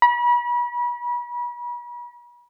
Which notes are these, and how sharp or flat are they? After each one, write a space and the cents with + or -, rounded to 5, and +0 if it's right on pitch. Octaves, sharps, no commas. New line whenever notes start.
B5 -40